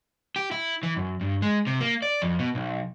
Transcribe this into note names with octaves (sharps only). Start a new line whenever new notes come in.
G4
E4
E3
F#2
G2
G#3
C3
A#3
D5
F2
B2
B1